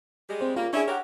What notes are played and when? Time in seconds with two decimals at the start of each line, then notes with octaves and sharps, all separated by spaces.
0.29 G3 G#3
0.41 C4 C5
0.56 C#3 G3 A#3 F4
0.73 C#4 D4 E4 G#4
0.88 G4 A#4 C#5 F#5